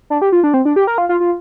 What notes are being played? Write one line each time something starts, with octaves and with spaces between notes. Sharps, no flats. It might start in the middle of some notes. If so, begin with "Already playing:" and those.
D4
G4
F4
D4
C4
D4
G4
A#4
F4
F4
F4